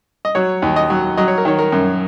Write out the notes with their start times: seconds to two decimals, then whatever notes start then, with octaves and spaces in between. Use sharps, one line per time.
0.25 D#5
0.35 F#3 C#5
0.62 D#2
0.76 D#5
0.90 F#3
1.17 F#3 D#5
1.28 C#5
1.38 A#4
1.45 D#3 C#5
1.59 A#4
1.72 F#2